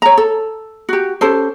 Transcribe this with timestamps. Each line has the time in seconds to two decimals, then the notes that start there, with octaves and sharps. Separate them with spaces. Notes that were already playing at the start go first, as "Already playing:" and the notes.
0.02 C#5 A#5
0.17 A4
0.89 F#4 G4
1.21 C#4 G4 A4 C5